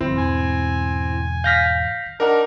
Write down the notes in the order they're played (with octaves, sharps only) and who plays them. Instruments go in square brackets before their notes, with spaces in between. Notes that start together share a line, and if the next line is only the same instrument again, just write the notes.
[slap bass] G1 F3 [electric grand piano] C4 [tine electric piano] E4
[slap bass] E2 G#2 B2 [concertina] G#5
[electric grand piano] F5 F6 [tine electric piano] G6 A#6 B6
[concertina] D4 D#4 [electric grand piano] A#4 F#5 A#5